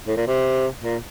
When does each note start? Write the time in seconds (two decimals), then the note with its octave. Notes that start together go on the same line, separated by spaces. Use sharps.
0.07 A2
0.17 A#2
0.28 C3
0.83 A#2